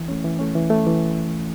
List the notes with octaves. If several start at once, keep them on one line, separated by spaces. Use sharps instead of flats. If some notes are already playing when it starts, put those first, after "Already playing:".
Already playing: E3
A3 C#4
E3
A3 C#4
E3
A3 C#4
E3